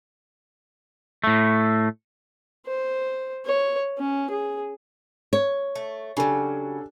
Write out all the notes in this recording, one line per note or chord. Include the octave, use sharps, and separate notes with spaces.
A2 A3
C5
C#5
C#4
G#4
C#5
A3
C#3 F#3 D4 G4 A4